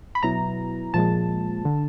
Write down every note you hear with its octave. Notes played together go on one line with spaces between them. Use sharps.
B5
B2 F#3 B3 E4 A#5
A#2 F3 G#3 A5
D3